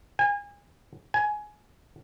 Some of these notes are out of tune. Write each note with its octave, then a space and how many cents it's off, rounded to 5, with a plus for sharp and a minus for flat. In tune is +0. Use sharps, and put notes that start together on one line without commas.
G#5 -35
G#5 +15